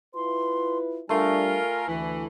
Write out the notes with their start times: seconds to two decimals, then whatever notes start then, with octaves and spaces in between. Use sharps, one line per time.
0.15 E4 F4 B4 C6
1.09 G3 A3 D4 F4 A#4 G#5
1.88 D2 E3